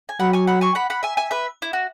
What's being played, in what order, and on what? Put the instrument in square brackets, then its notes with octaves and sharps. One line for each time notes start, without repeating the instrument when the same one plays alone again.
[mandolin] G#5
[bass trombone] F#3 [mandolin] F#5 B5
[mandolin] G#5 C#6
F#5 B5
G#5 C#6
F#5 B5
F#5 B5
E5 G#5
E5 G#5
B4 E5
E4
F#4